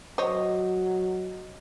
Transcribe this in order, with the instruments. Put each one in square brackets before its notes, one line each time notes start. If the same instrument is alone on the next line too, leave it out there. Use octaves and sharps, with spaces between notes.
[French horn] F#3 [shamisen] C5 C#5 [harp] D#5